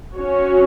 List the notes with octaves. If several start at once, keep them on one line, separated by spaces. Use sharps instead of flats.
C#4 F#4 C#5